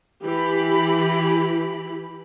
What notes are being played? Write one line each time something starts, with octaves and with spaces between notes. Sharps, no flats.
E3 G4 B5